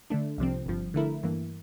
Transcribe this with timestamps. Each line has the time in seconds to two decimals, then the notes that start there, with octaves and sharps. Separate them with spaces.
0.10 D3 A3 D4
0.38 C2 C3 F3 C4
0.66 G1 G2 F3
0.94 D3 A3 E4 A#4
1.23 G2 E3 A#3